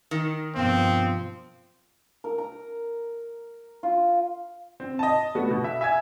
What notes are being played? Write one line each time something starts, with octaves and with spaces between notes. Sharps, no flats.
D#3
G2 B2 F3 B3 C4
A#4
A#5
F4
C4
D#5 A5
A3 B3 F#4
B2
E5
E5 G#5 G#6